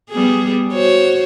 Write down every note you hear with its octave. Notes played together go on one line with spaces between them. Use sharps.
G3 B3 G#4
F#4 C5 C#5